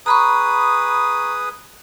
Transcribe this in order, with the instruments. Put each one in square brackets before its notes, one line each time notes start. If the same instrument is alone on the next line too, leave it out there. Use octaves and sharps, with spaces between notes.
[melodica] G#4 B4 D#6 [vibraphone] A#5 B5 C#6